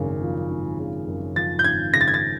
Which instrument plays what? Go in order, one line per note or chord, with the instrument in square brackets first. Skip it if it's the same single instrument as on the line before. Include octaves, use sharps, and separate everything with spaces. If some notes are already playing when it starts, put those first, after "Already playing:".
Already playing: [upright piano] G#1 F#2 C#3
F3
G#1
C#3
F#2
[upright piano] F3 [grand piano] A6
[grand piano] G6
[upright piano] G#1 [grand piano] G#6
[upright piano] C#3 [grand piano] A#6
[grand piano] A6
G#6
A6